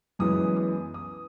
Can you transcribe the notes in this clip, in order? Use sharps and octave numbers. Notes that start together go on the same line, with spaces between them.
F#2 E3 G#3 B3 D#6
D#6
D#6